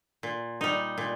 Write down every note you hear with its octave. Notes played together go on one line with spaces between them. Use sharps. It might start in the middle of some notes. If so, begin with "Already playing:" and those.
A#2
G3 D#4
A#2